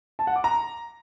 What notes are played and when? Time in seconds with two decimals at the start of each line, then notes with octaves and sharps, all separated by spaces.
0.19 A5
0.27 F#5
0.36 D6
0.44 A#5